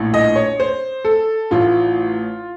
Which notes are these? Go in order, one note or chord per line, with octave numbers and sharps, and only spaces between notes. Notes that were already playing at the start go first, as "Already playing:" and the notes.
Already playing: A#1 A2
D#5
C#5
C5
A4
A1 A2 F4